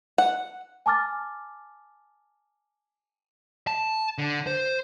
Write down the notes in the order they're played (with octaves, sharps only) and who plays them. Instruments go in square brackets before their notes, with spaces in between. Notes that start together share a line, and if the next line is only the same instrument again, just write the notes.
[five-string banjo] F#5
[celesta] G#5 A5 D6 F6 A6
[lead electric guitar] A5
D3
C5